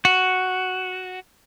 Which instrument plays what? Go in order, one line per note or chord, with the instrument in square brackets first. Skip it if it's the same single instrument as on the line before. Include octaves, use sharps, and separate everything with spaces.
[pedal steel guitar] F#4